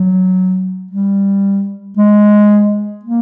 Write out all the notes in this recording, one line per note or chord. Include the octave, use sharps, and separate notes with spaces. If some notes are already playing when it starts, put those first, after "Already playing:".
Already playing: F#3
G3
G#3
A#3